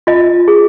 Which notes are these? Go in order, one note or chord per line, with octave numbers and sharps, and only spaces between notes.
F4 D#5
G#4